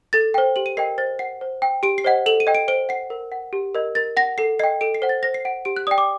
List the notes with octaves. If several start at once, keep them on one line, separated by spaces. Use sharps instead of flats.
A4 A6
C5 G5
G4 F#7
D#7
A#4 D#5 G5 C7
C5 A6
F#5 C7
C5
G5
G4 D7
C7
C5 D#5 F#5
A4 F#7
D#7
D#5 G5
D7
C5 D7
F#5 C7
A#4
F#5
G4
A#4 D#5
A#4 A6
F#5 A#6
A4 C7
D#5 G5 C7
A4 D7
C7
C5 F#5
A6
C5 A#6
C7
F#5 D7
G4 D7
F#6
D5 G5 D#6
D6